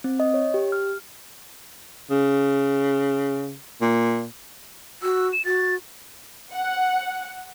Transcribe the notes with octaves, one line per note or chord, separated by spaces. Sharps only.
C4
D#5
C#5
G4
F6
C#3
A#2
F#4 E6
E7
F#4 A6
F#5